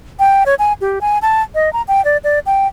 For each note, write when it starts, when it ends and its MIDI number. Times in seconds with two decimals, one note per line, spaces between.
0.19 0.44 79
0.46 0.55 73
0.59 0.73 80
0.81 0.99 67
1.01 1.19 80
1.22 1.42 81
1.55 1.72 75
1.73 1.82 82
1.88 2.04 79
2.05 2.17 74
2.24 2.39 74
2.46 2.67 79